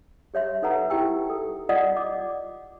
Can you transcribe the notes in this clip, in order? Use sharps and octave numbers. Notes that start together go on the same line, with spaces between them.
G4 C#5 E5 C6
D#4 A4 B4 F#5 A#5
D#4 E4 G4 G5 E6
A4
F4 D5 D#5 F#5 D#6
D6